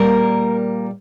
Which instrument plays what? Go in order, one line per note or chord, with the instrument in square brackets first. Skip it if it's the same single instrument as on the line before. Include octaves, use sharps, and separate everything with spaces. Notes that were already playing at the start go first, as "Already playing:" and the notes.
Already playing: [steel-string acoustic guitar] A#2 G3 A#3 A#4